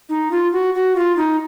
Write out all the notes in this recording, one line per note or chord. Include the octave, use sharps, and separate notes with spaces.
D#4
F4
F#4
F#4
F4
D#4